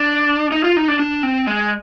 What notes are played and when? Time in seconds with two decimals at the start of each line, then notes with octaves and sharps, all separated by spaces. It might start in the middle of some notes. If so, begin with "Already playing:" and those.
Already playing: D4
0.52 D#4
0.64 F4
0.77 D#4
0.88 D4
0.99 D4
1.23 C4
1.47 G#3